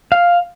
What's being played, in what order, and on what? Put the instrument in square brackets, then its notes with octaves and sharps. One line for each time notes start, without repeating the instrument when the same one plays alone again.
[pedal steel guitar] F5